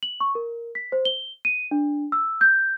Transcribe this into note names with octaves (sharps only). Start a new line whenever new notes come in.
F#7
C#6
A#4
B6
C5
G7
D#7
D4
E6
G6